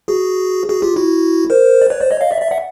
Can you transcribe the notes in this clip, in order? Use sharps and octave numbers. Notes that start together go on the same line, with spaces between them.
F#4 G#4
F#4 G#4
F4 G4
E4 F#4
A#4 C5
D5
B4 C#5
C5 D5
C#5 D#5
D#5 F5
D5 E5
D5 E5
E5 F#5